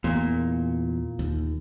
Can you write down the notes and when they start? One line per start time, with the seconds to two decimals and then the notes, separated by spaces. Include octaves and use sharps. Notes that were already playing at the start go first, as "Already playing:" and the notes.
0.04 E2 A#2
1.19 D#2